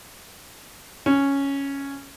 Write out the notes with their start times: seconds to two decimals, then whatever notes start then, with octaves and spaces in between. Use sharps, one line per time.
1.06 C#4